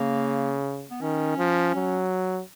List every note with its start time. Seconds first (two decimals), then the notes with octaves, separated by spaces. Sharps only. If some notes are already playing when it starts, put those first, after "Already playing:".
Already playing: C#3 A#3
0.91 B3
1.01 D#3 C#4
1.38 F3
1.75 F#3